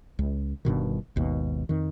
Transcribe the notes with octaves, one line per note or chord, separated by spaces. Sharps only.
C#2
G1 G2 B2 D#3
G#1 D#2 B2
F2 D#3